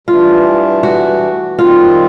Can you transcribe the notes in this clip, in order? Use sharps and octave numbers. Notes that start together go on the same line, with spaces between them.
G2 E3 A3 D4 F4
F#4
D#3 G3 C4 F4